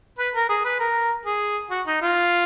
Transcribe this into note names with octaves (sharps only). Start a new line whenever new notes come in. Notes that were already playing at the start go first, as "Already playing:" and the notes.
B4
A#4
G#4
B4
A#4
G#4
F#4
D#4
F4